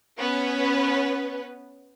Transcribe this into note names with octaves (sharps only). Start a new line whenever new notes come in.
B3 C#4 B4